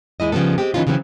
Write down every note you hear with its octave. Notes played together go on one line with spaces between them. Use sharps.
D#2 G#3 E4 D#5
C#3 F3 G3 B3 A4
G#3 C4 G4
D#3 E3 B3 C#4 D#4 F4
C#3 E3 F#3 A#3 C4 C#4